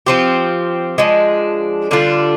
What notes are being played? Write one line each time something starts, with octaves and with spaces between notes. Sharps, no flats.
F3 C4 G4
F3 G#3 D4
D3 G3 D4 F4